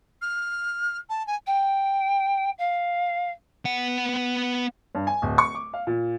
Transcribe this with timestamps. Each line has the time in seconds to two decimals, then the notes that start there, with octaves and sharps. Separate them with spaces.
0.22 F6
1.09 A5
1.27 G#5
1.47 G5
2.58 F5
3.65 B3 F#5
4.95 G2
5.07 G#5
5.22 D1
5.38 C#6
5.55 D6
5.73 F5
5.87 A#2